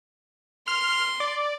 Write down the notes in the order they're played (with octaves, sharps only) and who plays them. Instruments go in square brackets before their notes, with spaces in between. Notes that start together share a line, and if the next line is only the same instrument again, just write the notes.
[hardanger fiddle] C6 [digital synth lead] F6
[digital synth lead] D5